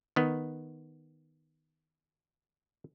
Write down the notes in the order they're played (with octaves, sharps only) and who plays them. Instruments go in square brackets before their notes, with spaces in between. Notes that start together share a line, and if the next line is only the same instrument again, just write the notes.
[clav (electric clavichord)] D#3 B3